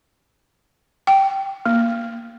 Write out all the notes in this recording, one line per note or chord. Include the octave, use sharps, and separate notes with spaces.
G5
A#3